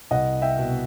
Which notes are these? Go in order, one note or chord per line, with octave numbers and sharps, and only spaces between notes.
C2 D#5 F#5
E5 G5
B2